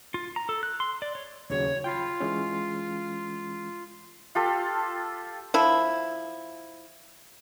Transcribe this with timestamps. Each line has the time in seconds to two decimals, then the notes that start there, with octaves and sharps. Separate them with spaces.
0.14 F4
0.36 A#5
0.49 A4
0.63 F#6
0.80 C6
1.02 D5
1.15 C#5
1.50 D#2 C#3 F#3 C#5
1.84 F4 G5 B5
2.20 E3 G#3 C#4
4.35 F4 G4 A4
5.54 F3 E4